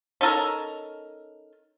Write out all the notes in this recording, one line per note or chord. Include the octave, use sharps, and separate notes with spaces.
C#4 D#4 A4 A#4